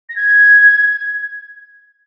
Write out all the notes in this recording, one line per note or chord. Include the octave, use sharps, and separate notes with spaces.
A#6
G#6